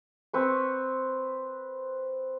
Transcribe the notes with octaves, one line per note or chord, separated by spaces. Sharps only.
C4 B4 C#6